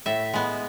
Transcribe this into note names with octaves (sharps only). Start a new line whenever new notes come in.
A2 E5
G#3 B3